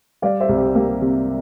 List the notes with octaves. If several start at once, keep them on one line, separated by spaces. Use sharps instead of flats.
G3 D5 F5
C5 E5
C2
G4
A#3 G4
C3